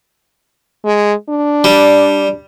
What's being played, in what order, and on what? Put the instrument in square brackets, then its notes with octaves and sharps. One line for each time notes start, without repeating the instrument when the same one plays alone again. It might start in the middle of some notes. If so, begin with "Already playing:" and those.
[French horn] G#3
D4
[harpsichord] G3